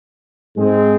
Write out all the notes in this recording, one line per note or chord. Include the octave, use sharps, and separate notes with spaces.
G#2 G#3 C4 G#4